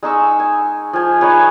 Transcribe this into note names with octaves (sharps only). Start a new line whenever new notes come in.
G#3 D#4 C#6 E6
G#5
F3 G#5
D#4 G#4 B4 C#5